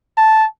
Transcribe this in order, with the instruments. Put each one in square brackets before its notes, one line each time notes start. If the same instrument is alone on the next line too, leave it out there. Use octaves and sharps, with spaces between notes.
[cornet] A5